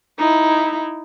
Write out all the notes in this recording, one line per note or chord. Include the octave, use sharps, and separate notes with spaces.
D#4 E4